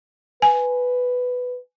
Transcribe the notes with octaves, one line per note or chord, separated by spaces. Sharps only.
B4 G#5